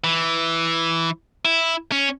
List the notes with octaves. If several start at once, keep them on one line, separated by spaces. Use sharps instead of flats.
E3
E4
C#4